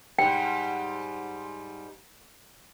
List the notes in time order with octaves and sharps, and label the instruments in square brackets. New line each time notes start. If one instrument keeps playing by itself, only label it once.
[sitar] G#2 G3 [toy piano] G5